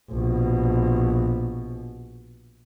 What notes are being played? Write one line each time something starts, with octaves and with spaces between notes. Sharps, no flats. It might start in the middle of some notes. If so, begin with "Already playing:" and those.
A#1 B2